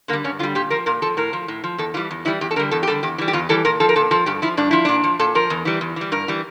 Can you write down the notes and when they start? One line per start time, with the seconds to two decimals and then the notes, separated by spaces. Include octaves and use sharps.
0.08 D3 A#3
0.13 G3
0.24 G2 C#4
0.39 D3 F4
0.43 G3
0.55 A#2 G4
0.70 F3 A#4
0.86 A#2 A#4
1.02 F3 A4
1.17 A2 A#4
1.33 F3
1.48 A2
1.64 F3
1.78 E2 A4
1.94 E3 G3 F4
2.11 E2
2.25 E3 G3 E4
2.41 E2 G4
2.51 A4
2.56 D3 A#4
2.59 G3
2.71 E2 A4
2.83 G4
2.87 D3 G3 A4
3.03 E2 G4
3.18 E3 G3
3.28 G4
3.33 E2 F4
3.49 E3 G3 A4
3.65 A#2 A#4
3.80 F3 A4
3.89 A#4
3.96 A#2 A4
4.11 F3 A4
4.26 G2 G4
4.42 F3 E4
4.57 G2 D4
4.71 F3 E4
4.85 A#2 D4
5.04 F3
5.19 A#2 A4
5.35 F3 A#4
5.50 E2
5.65 E3 G3
5.81 E2
5.96 E3 G3
6.12 G2 A#4
6.28 E3 G3